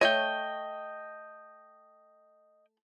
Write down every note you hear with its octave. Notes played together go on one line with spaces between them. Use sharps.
A3 C#5 D#5 G5